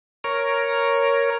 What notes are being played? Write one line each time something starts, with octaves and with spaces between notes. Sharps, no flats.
A#4 C#5